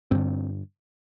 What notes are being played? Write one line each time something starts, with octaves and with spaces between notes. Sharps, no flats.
G2 D3 C4